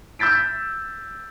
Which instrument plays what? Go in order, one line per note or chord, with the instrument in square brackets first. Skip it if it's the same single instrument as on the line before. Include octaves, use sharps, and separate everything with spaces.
[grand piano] E6 G6 A6 B6 D7